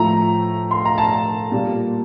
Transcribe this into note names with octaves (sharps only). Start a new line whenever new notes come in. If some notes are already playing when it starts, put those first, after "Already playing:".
Already playing: A2 F3 A3 A#5
C6
A#5
A5
A#2 G3 A#3